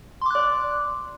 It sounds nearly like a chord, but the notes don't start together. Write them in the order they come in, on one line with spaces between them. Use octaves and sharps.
C6 D6 F#6 D5